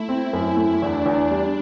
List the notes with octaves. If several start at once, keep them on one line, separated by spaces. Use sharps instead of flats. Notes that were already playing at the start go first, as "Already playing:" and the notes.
Already playing: A3 E4
C4
F#2
A3
E2 D4
E2
G3